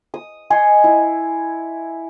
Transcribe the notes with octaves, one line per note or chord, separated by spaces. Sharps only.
D#6
D#5 G#5 C6 C#6
E4